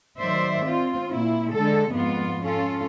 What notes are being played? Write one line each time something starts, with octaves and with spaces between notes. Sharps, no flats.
D#3 F#3 C5 D5 E5
C4 F4
A#2 E4
D3 G#3 A4
F2 G#2 B3 F4
C#4 F4 A4